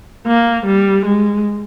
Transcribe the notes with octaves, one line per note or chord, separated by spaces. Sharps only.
A#3
G3
G#3